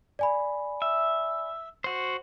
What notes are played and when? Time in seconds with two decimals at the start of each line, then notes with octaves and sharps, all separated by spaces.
0.19 D5 G#5 B5
0.82 E5
1.84 F#4 C5